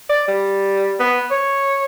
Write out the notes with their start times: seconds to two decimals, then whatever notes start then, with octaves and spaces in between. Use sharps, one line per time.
0.09 D5
0.28 G3
1.00 B3
1.31 C#5